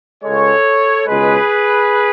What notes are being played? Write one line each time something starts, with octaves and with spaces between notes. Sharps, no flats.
C#2 C#3 G#3 A4 C#5
C#2 B2 G#3 G#4 B4